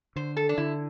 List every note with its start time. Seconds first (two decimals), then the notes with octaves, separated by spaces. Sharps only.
0.16 D3 C5
0.37 A4
0.49 D4
0.57 D3 E4